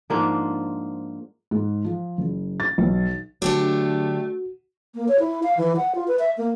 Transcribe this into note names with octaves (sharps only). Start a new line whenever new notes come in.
G#2 F3 A#3 D4
G#2
F3
F#1
A6
B1
D3 F#3 A3 D4 F#4 G4 A4
A#3
C#5
E4
F5
E3
F#5
F4
B4
E5
A#3